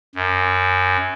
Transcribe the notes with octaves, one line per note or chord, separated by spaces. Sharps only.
F#2